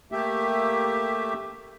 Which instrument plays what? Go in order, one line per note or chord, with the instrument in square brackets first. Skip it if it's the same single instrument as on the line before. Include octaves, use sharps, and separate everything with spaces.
[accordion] A3 A#3 G4 E5